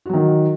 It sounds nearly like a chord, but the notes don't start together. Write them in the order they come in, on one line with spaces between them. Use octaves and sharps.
F#4 F#3 D#3